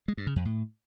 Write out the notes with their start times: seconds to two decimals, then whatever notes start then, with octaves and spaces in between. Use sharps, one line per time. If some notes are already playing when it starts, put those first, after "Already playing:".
0.08 G#3
0.17 G2
0.27 C#3
0.36 F2
0.45 A2